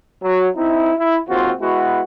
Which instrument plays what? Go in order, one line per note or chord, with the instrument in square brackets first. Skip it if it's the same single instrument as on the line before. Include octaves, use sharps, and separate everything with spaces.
[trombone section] F#3
C4 D#4 E4
E4
D#2 G#2 C4 F4 F#4
G#3 B3 E4 F#4